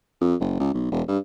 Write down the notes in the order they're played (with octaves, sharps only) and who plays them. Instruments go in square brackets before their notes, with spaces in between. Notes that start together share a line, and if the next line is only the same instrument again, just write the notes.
[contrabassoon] F2
F#1
C#2
B1
E1
G2